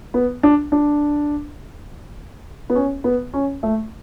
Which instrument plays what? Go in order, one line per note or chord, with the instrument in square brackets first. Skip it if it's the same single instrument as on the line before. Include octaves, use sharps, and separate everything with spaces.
[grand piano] B3
D4
D4
B3
C#4
B3
C#4
A3